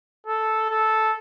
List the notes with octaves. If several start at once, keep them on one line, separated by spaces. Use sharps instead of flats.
A4
A4